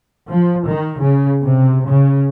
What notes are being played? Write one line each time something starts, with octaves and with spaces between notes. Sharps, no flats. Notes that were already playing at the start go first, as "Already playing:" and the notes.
F3
D#3
C#3
C3
C#3